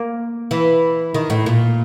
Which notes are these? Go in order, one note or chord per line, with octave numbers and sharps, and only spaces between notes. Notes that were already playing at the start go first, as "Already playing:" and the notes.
Already playing: A#3
E3
D#3
A2
A#2